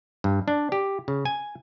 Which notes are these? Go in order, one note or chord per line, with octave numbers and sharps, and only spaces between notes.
G2
D4
G4
C#3
G#5